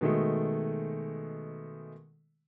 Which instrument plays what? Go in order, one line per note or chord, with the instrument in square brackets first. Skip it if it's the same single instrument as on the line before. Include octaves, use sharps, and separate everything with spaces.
[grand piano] B2 D#3 G#3 A3